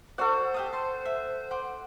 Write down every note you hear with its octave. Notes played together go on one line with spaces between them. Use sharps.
F#4 A4 C5 D5 F#5
G4 F5 D#6
A5 C6
E5
F#5 C6 D6